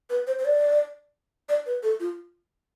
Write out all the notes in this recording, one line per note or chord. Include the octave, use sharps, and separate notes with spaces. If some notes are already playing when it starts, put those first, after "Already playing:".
B4
C5
C5
D5
D5
B4
A4
F4